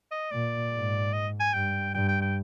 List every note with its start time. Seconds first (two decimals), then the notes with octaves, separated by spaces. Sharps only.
0.11 D#5
0.31 A#2 D5
0.73 G#2
1.13 D#5
1.40 G#5
1.54 G2 G5
1.94 G2 G5
2.08 G5
2.22 G5